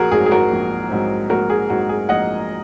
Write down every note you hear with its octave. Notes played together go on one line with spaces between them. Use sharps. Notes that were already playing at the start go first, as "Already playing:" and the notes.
Already playing: A#1 F#4 G#4 A#4
G#2 F#3 C4 G#4
G#4
F#4 A#4
A#1
G#2 F#3 C4
A#1 F#4 A#4
G#4
G#2 F#3 C4 F#4
G#4
A#1 D#5 F#5